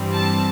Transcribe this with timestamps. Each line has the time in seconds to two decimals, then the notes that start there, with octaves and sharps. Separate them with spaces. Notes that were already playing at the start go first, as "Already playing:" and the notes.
Already playing: G2 E3 G3 C4
0.14 A5